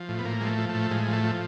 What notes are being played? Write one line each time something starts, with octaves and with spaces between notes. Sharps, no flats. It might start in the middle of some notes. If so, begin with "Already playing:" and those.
Already playing: F3
A2
B3
A2 A#3
F3 G#3
A3
F3
A3
A2
A2 G#3
F3
A3
F3